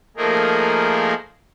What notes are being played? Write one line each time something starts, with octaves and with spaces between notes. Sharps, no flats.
F3 A3 A#3 D#4 G#4 A#4